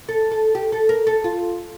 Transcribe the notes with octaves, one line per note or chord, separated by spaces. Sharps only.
A4
A4
G4
A4
A#4
A4
F4